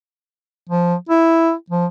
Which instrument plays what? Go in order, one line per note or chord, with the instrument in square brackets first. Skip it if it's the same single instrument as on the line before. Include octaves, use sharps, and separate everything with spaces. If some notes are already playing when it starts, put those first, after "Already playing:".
[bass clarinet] F3
E4
F3